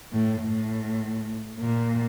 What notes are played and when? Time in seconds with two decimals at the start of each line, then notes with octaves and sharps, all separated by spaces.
0.12 A2
0.41 A2
1.59 A#2